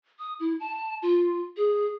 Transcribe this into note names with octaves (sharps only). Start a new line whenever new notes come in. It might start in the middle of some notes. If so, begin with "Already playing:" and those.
D#6
E4
A5
F4
G#4